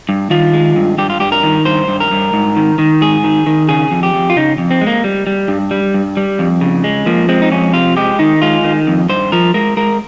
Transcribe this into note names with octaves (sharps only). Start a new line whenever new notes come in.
G2
D#3 F4
G#3
G2
G2 G4
F4
G2 G4
A#4
D#3
G2 C5
G2
A#4
G2
G#2
D#3
D#3
G#2 G#4
D#3
D#3
C#3 G#4
F2
G4
F2
F4
C#3 D#4
F2
C4
G#3
A#3
G3
G3
G2
G3
G2
G3
F2
C#3
G#3
F3 A#3
G#3 C4
D#4
F2 C#4
C3 F4
G#3 G4
D#3 D#4
G#3 F4
D#3
F2
G2 C5
F3 A#4
G#3 A#4
G#3 A#4